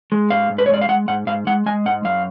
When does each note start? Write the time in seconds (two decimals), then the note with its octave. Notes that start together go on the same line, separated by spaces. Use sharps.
0.12 G#3
0.30 G#2 F5
0.50 G#2
0.58 B4
0.66 C#5
0.69 G#3 D5
0.81 F5
0.89 G#3 F#5
1.08 G#2 F#5
1.27 G#2 F5
1.47 G#3 F#5
1.66 G#3 G#5
1.86 G#2 F#5
2.05 F#2 F5